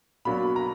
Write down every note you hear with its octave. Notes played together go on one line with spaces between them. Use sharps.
B2 F#3 A#3 D4 B5
A#5